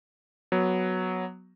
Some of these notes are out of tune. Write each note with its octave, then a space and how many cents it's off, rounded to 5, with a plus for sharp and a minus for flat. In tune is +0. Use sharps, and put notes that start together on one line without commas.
F#3 +0 B3 -5